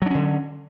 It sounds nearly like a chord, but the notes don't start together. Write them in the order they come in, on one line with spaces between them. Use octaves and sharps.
F#3 D4 C#4 D3